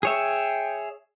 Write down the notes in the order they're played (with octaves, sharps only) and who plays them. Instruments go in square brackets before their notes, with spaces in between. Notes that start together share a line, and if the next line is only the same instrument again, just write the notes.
[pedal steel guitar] G#4 C#5 E5 [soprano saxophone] G5